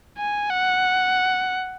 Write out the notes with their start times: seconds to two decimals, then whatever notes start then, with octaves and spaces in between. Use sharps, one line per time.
0.18 G#5
0.51 F#5